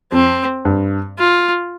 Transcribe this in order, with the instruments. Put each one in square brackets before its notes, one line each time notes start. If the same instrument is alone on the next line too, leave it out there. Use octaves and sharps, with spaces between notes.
[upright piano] F2 [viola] C4
[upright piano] G2
[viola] F4